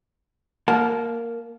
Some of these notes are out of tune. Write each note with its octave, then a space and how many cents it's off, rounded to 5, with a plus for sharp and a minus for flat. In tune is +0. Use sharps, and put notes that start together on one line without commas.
A#3 -5 F#5 -35 A5 -30